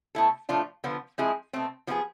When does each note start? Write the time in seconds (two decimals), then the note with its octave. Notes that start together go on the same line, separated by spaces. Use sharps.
0.15 B2 A3 E4 A4
0.49 A2 F3 A3 D4 F4
0.84 D3 F3 B3 F4
1.18 F3 G#3 C4 E4 G#4
1.53 B2 A3 C4
1.87 F3 B3 E4 G#4